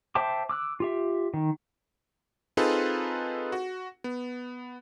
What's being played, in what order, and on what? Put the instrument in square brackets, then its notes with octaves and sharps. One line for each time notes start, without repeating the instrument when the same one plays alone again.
[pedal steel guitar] C5 E5 G5 A5 D6
D6 E6 F#6
F4 G4 E5
D#3
[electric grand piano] C4 D#4 F4 G#4 A4 B4
F#4
B3